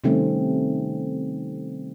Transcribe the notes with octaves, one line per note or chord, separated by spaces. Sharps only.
C3 D#3 G3 A3 C4 C#4